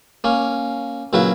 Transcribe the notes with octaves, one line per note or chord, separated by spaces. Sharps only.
A#3 C#4
A#2 C#3 F#3 E4 B4